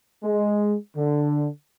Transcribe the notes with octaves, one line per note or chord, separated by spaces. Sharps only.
G#3
D3